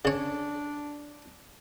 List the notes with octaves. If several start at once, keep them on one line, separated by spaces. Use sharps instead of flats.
C#3 D4 C#5